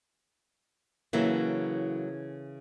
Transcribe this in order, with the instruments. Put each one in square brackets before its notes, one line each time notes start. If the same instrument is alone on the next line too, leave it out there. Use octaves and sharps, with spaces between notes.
[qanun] C#3 E3 A4 [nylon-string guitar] F#3 A#3 E4